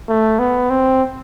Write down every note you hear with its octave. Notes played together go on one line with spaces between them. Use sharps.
A3
B3
C4